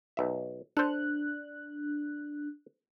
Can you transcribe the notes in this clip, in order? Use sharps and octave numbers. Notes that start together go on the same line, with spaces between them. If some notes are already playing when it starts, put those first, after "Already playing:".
B1 E5
D4 A4 C5 F#6